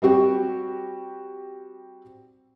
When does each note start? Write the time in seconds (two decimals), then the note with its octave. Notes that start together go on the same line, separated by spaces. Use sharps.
0.02 G3 C4 F#4 G4